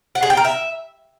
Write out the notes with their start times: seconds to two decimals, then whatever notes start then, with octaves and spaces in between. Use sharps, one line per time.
0.15 F#5
0.23 G#4
0.30 G5
0.37 A#4
0.45 E5